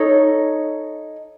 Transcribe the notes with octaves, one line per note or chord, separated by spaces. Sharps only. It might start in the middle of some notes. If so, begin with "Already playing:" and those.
Already playing: D#4 A4 C#5